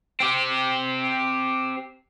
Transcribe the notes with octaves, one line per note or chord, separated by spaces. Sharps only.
C4 G4